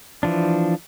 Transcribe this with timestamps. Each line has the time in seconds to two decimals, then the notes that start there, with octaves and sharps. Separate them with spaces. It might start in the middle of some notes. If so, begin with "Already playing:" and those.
0.23 E3 F3 D4